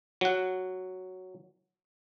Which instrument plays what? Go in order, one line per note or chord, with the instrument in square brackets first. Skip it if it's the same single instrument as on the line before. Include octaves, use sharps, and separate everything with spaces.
[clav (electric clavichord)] F#3 F#5